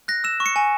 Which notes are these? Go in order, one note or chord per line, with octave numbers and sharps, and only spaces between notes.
F#6 A#6
E6 E7
C#6
C#7
G#5